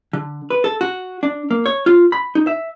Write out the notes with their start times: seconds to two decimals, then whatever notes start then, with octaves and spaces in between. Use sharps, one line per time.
0.13 D3
0.50 B4
0.64 A4
0.81 F#4
1.23 D4
1.51 A#3
1.66 C#5
1.86 F4
2.12 B5
2.35 D#4
2.47 E5